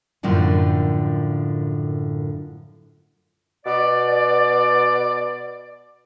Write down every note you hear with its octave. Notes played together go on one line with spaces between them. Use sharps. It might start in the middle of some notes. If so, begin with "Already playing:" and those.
F#2 A2 D3 F3 A#3
B2 D5